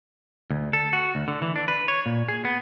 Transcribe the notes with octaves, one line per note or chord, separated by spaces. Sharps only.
D2
A4
F#4
D2
D3
E3
D4
B4
C#5
A#2
G#4
B3